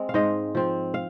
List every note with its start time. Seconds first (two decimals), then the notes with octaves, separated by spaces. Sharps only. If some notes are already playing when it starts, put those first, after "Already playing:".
Already playing: G#3 C4
0.09 F5
0.14 G#2 C5 D#5
0.55 F3 C4
0.94 F5